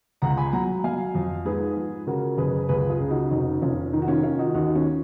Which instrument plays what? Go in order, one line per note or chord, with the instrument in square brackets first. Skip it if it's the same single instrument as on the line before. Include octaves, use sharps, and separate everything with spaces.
[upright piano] C#2 F#5 A#5
G#5 B5
F#3 F#5 A#5
F#3 F5 G#5
F2
G#2 G#4 B4
F3
C#3 F#4 A#4
F#1 G#4 B4
C#2 G#4 B4
F4 G#4
C#3
D#4 F#4
F1 D#4 F#4
F1 C#4 F4
D#3 D#4
F#4
C#4 F4
D#3 C#4 F4
D#4 F#4
D#2 D#4 F#4
C#4 F4